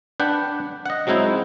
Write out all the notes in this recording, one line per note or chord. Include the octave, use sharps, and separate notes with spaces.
D4 B4 F#5 G5
D#5 F#5
F#3 G#3 C4 D#4 E4